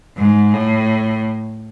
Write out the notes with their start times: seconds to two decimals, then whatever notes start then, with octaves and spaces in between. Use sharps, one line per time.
0.17 G#2
0.54 A2